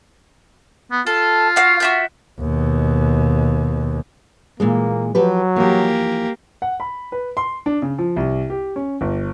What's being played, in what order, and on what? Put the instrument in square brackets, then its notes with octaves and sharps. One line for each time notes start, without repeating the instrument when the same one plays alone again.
[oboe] B3
[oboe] F4 [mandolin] A4
[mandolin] F#4 F5
F#4 E5 G6
[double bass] D#2 B2
[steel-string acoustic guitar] A#2 E3 G#3 [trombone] A#3
[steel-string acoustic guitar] F3 G4 B4 [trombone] F#3
[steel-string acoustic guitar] E3 F3 [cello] A#3 G4
[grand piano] F#5
B5
B4
C6
D4
C#3
F3
C2
G4
C#4
G1